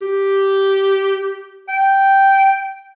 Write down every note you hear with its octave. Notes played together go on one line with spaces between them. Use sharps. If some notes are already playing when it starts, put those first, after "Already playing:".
G4
G5